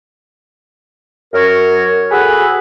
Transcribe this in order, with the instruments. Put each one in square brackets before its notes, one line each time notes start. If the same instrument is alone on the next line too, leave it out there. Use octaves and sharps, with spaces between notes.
[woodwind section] F#2 A#4 C#5
F#4 G#4 A4 B4